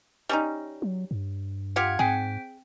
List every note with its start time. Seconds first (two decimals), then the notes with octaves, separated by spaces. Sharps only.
0.29 G3 C#4 D#4
0.82 F#3
1.11 G2
1.76 F4 G4 F5 F#5 G#6 C#7
1.99 G#2 C4 G#4 G5 B6